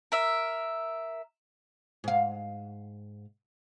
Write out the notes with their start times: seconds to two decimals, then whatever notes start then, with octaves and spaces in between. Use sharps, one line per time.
0.12 A#4 E5
2.04 G#2 F5